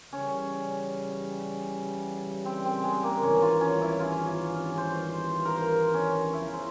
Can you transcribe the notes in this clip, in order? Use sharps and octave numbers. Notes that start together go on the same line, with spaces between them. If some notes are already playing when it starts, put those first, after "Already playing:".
C#3 E3 G3 C#4
C4
C4
G#3
A#3
G#1 G2 E3 G3 C#4
F4
C#4
E4
F4
C5
A#4
C5
C#4
E2 C#3 F3 E4
C5